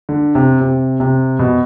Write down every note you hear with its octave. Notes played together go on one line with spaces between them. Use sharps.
D3
C3
C3
C3
B2